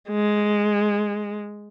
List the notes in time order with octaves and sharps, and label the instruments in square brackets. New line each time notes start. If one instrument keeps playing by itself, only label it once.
[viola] G#3